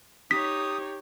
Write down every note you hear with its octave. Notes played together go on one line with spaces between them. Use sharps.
D#4 G4 C#5 D#6 B6